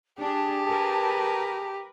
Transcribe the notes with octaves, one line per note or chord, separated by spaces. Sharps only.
D4 G4 G#4 A5
A#4 B4